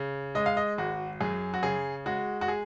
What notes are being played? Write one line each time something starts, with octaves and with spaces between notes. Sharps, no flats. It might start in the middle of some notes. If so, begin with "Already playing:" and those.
Already playing: C#3
G#3 D#5
F5
D#5
G#1 F#4
F#2 G#4
F#4
C#3 G#4
G#3 F#4
F#4
G#4